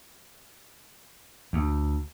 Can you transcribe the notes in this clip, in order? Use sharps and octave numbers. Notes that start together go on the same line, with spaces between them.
D2